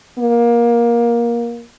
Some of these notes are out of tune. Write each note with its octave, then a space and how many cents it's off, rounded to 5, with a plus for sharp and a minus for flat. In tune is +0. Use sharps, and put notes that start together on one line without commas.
A#3 +20